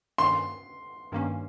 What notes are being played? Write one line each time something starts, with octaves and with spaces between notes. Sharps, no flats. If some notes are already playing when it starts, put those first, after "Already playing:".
G2 D#3 A#3 C#4 C6
G2 D#3 A#3 C#4